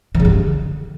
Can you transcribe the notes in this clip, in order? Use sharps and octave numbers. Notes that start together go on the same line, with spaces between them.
D#3
C#3
G3
D3